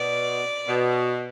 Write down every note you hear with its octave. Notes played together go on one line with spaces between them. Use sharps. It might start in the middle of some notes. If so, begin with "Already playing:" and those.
Already playing: B2 D5
B2